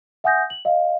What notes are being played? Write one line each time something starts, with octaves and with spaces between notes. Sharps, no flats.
E5 F#5 G#5 D#6 G6 A#6
F#7
D#5 F5